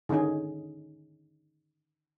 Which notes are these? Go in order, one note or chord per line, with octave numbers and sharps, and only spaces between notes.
D3 D#3 C#4 D#4 G#4